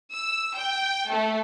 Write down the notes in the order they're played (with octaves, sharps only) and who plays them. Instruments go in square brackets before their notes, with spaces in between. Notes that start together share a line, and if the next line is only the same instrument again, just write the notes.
[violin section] E6
G5
A3